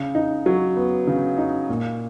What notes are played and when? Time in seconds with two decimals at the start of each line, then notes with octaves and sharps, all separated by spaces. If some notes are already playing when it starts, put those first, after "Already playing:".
Already playing: C#3
0.15 D#4
0.46 F#3
0.77 B3
1.07 C#3
1.38 D#4
1.69 A#2